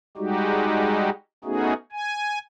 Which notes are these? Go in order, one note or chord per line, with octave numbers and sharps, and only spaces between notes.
G3 G#3 D#4 F#4 G4
A3 B3 C#4 D#4 F#4 G#4
G#5